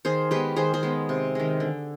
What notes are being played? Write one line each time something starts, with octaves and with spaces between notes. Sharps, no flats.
D#3 G#4 C5
G#3 B3 G4 B4
D#3 G#4 C5
G#4 C5
G#3 B3
C3
D#3 G#3
D3